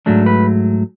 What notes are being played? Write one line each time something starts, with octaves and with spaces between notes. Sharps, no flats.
G#2 F#3 A3 D4
B4